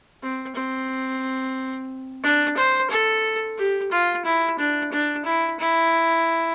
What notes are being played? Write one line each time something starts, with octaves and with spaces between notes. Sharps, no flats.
C4
C4
D4
C5
A4
G4
F4
E4
D4
D4
E4
E4